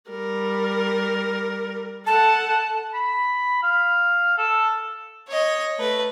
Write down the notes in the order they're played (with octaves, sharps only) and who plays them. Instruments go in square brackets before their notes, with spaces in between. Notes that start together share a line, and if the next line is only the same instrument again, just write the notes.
[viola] G3 A#4
[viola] A4 F#5 [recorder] A5
[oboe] B5
F5
A4
[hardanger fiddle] C#5 D#5
A3 B4